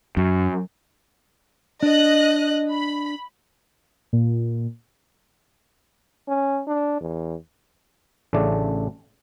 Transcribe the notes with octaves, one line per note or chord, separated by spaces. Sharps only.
F#2
D4 D#5 F#6
B5
A#2
C#4
D4
E2
A1 C#3 A3 D4 D5